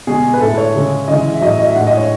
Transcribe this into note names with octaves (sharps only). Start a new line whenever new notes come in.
B2 G#3 G#4
B4
A2 G#3 A4
C#5
C#3 G#3
C#3 E3 G#3 D#5
E5
A2 F#3 D#5
D#5
E5
A2 G#3 F#5
D#5
C#5